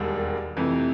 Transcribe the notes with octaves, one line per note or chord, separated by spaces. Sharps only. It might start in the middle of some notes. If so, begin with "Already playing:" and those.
Already playing: E1 D#2 D#3 G3
F2 C3 E3 A3